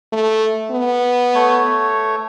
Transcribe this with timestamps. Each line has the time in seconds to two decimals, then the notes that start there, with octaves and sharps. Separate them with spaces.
0.13 A3
0.72 B3
1.35 A3 C#5